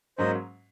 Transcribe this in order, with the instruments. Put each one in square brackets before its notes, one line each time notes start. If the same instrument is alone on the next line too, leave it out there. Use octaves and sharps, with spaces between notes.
[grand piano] G#2 F#3 A#3 C#4 [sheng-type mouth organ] C5 D#5